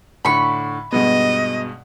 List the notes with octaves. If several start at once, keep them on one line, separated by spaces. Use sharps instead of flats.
A2 D3 B5 C#6
G2 B2 G#3 B3 D#5